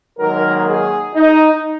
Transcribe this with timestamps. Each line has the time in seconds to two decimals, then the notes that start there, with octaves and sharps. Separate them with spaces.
0.19 G#2 D#3 F#3 A#3 A#4
0.67 G#4
1.14 D#4